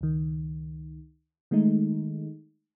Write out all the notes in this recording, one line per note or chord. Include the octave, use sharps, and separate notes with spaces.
C#2 D#3
D#3 G#3 A3 D#4